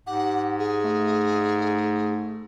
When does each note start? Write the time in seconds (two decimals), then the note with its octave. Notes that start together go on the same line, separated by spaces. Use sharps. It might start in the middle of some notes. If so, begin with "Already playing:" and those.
0.07 G#2 G4 F#5
0.59 G#4
0.84 A3